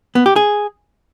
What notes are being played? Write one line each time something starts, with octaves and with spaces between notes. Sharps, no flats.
B3
G4
G#4